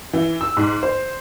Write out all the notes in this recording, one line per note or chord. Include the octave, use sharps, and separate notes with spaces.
E3
E6
G#2
C5